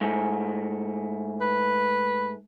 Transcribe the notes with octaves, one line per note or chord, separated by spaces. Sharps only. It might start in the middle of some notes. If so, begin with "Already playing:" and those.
G#2 A3
B4